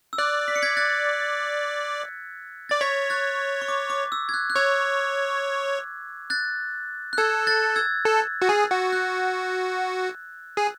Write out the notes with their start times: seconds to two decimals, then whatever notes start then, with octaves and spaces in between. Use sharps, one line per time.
0.13 E6
0.18 D5 F#6
0.48 B6
0.56 C#7
0.62 G#6 B6
0.77 F#6 A6
2.69 D5 A6
2.81 C#5 G#6 B6
3.10 F#6 A6
3.62 C#6
3.68 D6
3.90 D6
4.12 E6
4.29 G#6
4.34 F#6
4.50 F#6
4.56 C#5 E6 G#6
6.30 F#6 A6
7.13 F#6
7.18 A4 E6 G#6
7.47 F#6 A6
7.76 E6 G#6
8.05 A4
8.42 F#4
8.49 G#4
8.71 F#4
8.92 F#6
10.57 G#4